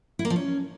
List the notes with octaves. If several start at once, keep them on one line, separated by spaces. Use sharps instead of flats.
E4
A#3
F3
C#4